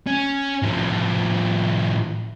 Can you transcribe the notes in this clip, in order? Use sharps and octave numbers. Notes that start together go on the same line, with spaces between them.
C#4
A2 F3